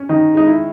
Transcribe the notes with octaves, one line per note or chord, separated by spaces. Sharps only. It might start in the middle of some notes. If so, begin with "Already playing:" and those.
Already playing: C#4
D#3 D#4
G#3 D#4
E4